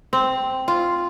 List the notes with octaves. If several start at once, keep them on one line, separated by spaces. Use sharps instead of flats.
C4
F4